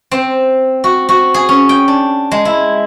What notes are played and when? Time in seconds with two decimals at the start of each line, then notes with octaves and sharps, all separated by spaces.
0.11 C4
0.84 F#4
1.09 F#4
1.34 G#4
1.49 C#4
1.69 G5
1.88 D4
2.31 G#3
2.45 E4